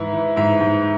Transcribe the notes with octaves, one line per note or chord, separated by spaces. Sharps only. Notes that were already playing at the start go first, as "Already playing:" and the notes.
Already playing: G#2 E3 E4
E3
G#2 E4 E5
G#2